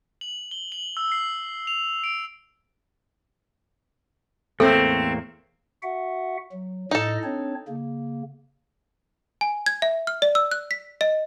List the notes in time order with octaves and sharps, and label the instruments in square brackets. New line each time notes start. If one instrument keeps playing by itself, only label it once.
[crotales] F#7
G7
F#7
E6
C7
F7
D7
[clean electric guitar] E2 A2 A#3 [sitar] A3 C4 [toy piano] A4
[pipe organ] F#4 E5 F#5
F#3
[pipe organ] A2 D#5 [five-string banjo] D#4 A4
[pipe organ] C4 D4 C#5
C#3 A#3
[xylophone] G#5
G#6
E5
F6
D5
E6
F#6
B6
D#5